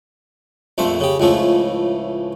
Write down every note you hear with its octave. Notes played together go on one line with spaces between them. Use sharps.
A#1 F2 A3 C5
C#3 G4
C#2 A2 F3 A3